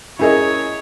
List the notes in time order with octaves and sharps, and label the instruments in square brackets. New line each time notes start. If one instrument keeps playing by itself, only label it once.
[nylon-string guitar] C#4 A#4 [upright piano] E4 G#4 D#5 [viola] C#5